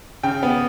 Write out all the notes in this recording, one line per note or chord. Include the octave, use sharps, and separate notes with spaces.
C#3 G5
B3